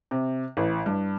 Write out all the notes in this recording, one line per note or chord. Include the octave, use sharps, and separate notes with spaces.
C3
A1
G2